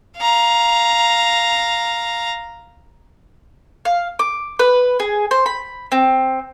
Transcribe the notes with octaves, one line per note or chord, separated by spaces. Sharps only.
F5 A#5
F5
D6
B4
G#4
C5
B5
C4